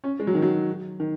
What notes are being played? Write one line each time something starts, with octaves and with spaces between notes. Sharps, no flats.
C#4
G#3
F#3
D#3
F#3
D#3